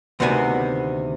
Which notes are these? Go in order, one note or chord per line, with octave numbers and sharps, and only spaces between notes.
D2 C3 D#3 B3 C4 G#5